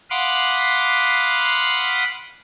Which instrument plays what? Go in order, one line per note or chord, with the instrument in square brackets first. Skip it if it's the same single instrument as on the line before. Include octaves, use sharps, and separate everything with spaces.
[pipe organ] F5 F#5 B5 C6 D6 D#6